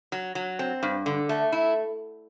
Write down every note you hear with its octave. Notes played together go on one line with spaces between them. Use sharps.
F#3
F#3
C4
G2
D3
A3
E4